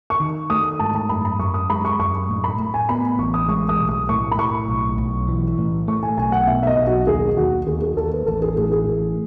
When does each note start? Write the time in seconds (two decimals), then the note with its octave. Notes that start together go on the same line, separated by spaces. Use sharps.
0.10 C#6
0.20 D#3
0.50 A3 D#6
0.79 G#2 A5
0.95 A5
1.09 F#2 B5
1.25 B5
1.39 F#2 C#6
1.54 D#6
1.69 G#3 B5
1.85 C#6
1.99 F#2 C#6
2.29 A2
2.44 B5
2.59 A2
2.74 G#5
2.89 B3 B5
3.19 A1 C#6
3.34 D#6
3.48 G#3 C#6
3.69 D#6
3.78 B1
3.89 D#6
4.09 A2 C#6
4.32 B5
4.38 A2 C#6
4.68 B1
4.98 B1
5.28 E3
5.58 A2
5.88 A3 C#6
6.03 G#5
6.17 B1 G#5
6.32 F#5
6.47 B2 E5
6.63 E5
6.67 D#5
6.77 B1
6.87 F#4
7.07 D#2 G#4
7.37 D#2 F#4
7.67 D#2 G#4
7.82 G#4
7.97 D#2 A4
8.12 B4
8.26 A1 A4
8.42 G#4
8.56 A2 G#4
8.72 G#4
8.86 A1